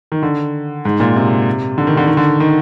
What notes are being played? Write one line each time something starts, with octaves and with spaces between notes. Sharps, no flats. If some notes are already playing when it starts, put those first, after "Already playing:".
D#3
D3
G#2
A#2
C3
D3
D#3
D3
D#3
D3
D#3